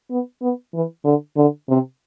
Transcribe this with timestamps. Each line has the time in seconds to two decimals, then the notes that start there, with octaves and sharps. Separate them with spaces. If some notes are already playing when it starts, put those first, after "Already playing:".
0.11 B3
0.42 B3
0.74 E3
1.04 D3
1.36 D3
1.69 C3